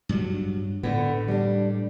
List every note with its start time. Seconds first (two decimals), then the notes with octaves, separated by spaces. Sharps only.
0.09 G2 F#3
0.83 A2 D3 B3
1.28 G3 D4